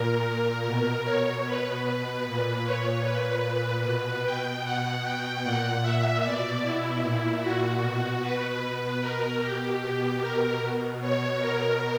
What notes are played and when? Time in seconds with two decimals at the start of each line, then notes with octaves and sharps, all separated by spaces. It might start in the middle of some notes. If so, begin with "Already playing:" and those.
Already playing: A#2 A#4
0.26 A#2
0.66 B2
1.05 B2 C#5
1.45 B2 B4
1.86 B2
2.25 A#2
2.65 A#2 C#5
3.04 A#2 B4
3.44 A#2
3.85 B2
4.24 B2 G5
4.63 B2 F#5
5.03 B2 G5
5.43 A#2 F#5
5.83 A#2 E5
6.23 B2 D5
6.62 B2 E4
7.02 A#2
7.42 A#2 F#4
7.82 B2
8.21 B2 B4
8.62 B2 B4
9.01 B2 A#4
9.41 B2 G4
9.80 B2 G4
10.20 B2 A#4
10.60 B2
11.00 B2 C#5
11.40 B2 A#4